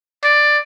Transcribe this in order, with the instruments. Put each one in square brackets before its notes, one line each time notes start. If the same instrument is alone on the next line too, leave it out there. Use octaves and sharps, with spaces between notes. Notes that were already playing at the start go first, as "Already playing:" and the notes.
[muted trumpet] D5